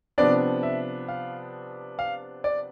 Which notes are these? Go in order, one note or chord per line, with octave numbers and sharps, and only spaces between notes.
C3 F3 B3 D4 D5
E5
F5
F5
D5